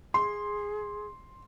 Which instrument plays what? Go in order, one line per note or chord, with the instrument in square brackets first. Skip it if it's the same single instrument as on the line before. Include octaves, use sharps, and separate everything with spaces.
[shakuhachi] G#4 [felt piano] C6